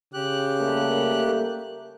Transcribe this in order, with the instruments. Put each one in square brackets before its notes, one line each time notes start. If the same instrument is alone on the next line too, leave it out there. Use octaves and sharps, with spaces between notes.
[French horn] C#3 [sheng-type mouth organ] G4 F#6
[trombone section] G3 A3 [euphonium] A#3